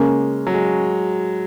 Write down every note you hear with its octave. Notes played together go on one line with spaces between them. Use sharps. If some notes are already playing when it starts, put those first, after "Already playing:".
Already playing: C#3 G#3 A#3 C#4
F#3
G#3